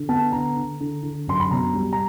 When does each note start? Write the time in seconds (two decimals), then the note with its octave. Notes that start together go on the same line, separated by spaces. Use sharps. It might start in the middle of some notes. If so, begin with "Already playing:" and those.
Already playing: D3
0.09 B3 A5
0.32 D3 A#5
0.56 D3
0.80 D3
1.03 D3
1.27 F#2 C6
1.40 B5
1.51 B2 A#5
1.75 G3
1.93 A#5